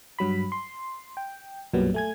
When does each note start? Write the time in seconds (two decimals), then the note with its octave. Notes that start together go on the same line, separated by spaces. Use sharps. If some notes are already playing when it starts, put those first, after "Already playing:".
0.19 G2 F#3 B5
0.52 C6
1.17 G5
1.73 B1 F#2 A#2 F#3 G3 B3
1.94 A3 G#5 G#6